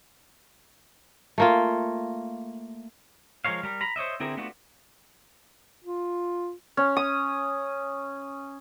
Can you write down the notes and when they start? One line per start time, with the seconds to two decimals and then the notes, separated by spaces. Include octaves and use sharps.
1.38 A3 A#3 F4
3.45 F3 G#3 A#4 C#5 F5
3.63 G3 A#4
3.81 A#5 B5
3.96 C5 C#5 D#5 E5
4.20 D3 C4 E4 G#4 A#4
4.37 A3 B3 D4 F4 F#4
5.84 F4
6.77 C#4
6.97 D#6